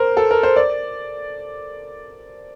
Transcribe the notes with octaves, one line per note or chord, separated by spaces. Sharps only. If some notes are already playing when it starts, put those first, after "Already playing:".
Already playing: A#4 C5
A4
A#4
C5
D5